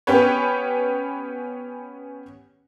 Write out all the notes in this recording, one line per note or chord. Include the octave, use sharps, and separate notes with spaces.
B3 C#4 G4 B4 C#5